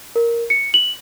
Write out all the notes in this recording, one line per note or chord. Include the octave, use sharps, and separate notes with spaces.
A#4
C#7
F#7